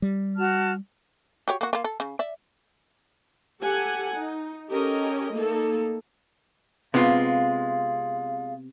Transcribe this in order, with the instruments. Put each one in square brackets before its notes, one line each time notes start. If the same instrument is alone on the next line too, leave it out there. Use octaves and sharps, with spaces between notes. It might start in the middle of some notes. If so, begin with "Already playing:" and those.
[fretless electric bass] G3
[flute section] F#4 A5 F6
[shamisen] F#4 G4 C#5
A#3 F#4
A#3 F4
A4
C#3
D5 E5
[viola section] G4 A4 F#5 G#5
D#4
C#4 G4 A4 A#4 D#5
A3 A#3 D#4 A4
[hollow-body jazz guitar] C3 B3 [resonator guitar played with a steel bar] G#3 F4 [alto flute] F5